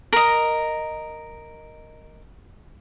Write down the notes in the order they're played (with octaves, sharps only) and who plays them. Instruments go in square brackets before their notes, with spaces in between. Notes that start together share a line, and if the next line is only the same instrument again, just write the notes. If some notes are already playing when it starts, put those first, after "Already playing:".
[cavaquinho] A#4 D#5